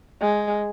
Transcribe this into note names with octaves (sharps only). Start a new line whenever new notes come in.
G#3